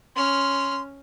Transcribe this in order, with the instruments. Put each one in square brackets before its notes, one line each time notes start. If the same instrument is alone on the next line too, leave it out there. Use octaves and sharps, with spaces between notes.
[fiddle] C#4 F6 [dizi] C6